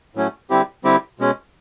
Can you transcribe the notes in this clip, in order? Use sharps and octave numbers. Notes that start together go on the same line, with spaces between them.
A2 F#3 A3 C#4
D3 G3 C4 E4 G4
D3 G3 C4 E4 G4
B2 G#3 C#4